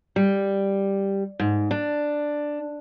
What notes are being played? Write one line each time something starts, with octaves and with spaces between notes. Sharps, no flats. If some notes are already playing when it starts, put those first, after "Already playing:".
G3
G#2
D4